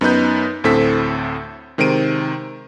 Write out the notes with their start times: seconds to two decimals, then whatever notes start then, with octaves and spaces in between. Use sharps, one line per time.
0.01 F#2 B3 D#4 B4 G6
0.64 D2 A2 C4 A4 B6
1.78 C3 D#3 G#3 C5 D7 D#7